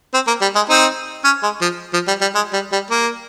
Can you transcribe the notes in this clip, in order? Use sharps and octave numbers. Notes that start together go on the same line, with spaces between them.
C4
A#3
G3
G#3
C4 D#4
C#4
G#3
F3
F3
G3
G3
G#3
G3
G3
A#3